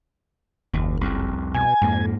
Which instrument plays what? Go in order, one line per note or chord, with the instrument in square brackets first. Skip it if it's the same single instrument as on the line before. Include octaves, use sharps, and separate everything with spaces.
[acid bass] F#1 [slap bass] D#2
[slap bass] C2 F2
[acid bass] B2 [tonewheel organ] G#5
[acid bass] F2 [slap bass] G#2 A#3